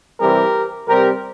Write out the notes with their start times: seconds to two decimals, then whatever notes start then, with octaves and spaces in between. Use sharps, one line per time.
0.19 C3 E3 G3 C4 G4 A#4
0.87 C3 G3 C4 G4 A#4